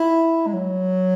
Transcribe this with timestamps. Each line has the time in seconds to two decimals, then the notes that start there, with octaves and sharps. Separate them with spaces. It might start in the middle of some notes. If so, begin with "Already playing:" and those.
Already playing: E4
0.47 G#3
0.53 F#3